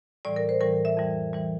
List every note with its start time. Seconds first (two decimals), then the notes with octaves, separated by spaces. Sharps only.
0.25 A2 E3 G3 D5
0.36 A#4
0.49 C5
0.61 A2 E3 G3 A#4
0.85 E5
0.97 F2 E3 G3
1.33 E3 G3